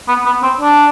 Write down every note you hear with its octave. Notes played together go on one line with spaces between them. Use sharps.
B3
B3
C4
D4